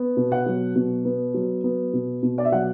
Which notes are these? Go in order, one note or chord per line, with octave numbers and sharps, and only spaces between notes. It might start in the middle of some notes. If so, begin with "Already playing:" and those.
Already playing: B3
B2
F#5
F#3
B2
B3
F#3
B3
B2
B2
D5
E5
F#3 F#5